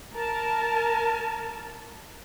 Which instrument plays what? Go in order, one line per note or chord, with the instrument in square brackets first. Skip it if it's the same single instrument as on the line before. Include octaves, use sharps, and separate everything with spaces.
[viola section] A#4 A5